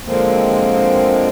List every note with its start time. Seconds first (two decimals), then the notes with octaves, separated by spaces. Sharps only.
0.05 D3 F3 G#3 A#3 C4